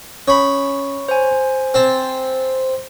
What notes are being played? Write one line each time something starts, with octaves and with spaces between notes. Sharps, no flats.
C#4 C#5 B5
C5 G#5
C4 A5